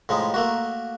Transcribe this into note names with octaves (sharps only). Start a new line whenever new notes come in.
A2 F3 G#3 D#4
A3 A#3 F#4